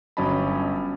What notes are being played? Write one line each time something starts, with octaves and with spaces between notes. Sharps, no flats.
G1 F#3 C#4 D#5 A5 B5